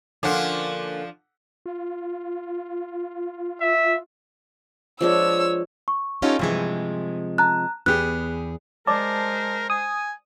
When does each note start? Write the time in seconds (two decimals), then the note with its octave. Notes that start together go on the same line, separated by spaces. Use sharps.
0.23 D3 F3 A#3 C#4 D4 F4 F#5 D6
1.66 F4
3.61 E5
5.01 F3 G#3 D4 C#5 E6
5.88 C#6
6.22 C#4 D#4 F4 G4 A4 C#5
6.39 G2 C3 E3 F3 G#3
7.38 A5 A#5 F#6
7.86 E2 B3 G4 G#4 F#6
8.87 G#3 A#4 C5 D5 A5 D6
9.70 G#5 D#6